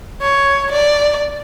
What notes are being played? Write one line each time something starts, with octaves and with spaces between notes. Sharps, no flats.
C#5
D5